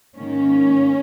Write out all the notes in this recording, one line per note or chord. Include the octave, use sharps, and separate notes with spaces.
G#2 D#3 A#3 C#4